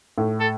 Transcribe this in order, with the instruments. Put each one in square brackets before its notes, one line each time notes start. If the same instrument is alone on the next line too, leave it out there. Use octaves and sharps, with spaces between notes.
[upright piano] A2
[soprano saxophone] A4